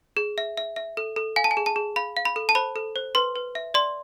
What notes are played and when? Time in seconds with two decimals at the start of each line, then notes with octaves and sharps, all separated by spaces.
0.17 G#4
0.38 E5
0.58 E5
0.76 E5
0.97 A4
1.16 A4
1.36 F5 G#5
1.44 A5
1.51 G#5
1.57 G#4
1.66 A5
1.76 G#4
1.96 F5 B5
2.17 F5
2.25 B5
2.36 A4
2.49 A5
2.55 C5 B5
2.76 A4
2.96 C5
3.15 B4 C6
3.36 B4
3.55 E5
3.74 D5 C6